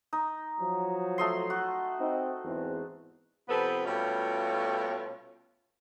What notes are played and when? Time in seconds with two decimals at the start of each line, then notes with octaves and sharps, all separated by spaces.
0.13 D#4
0.60 F3 F#3
1.18 A3 D#5 C6
1.50 F#4
2.00 C4 D#4
2.45 E2 G#2 C4
3.48 C3 F3 B3 C4 A4 B4
3.86 B2 G3 A3 C#4 F4